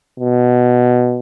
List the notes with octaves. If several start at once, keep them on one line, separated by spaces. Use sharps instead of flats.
B2